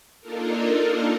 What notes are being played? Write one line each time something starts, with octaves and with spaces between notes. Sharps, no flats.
A#3 D4 D#4 F4 A4 A#4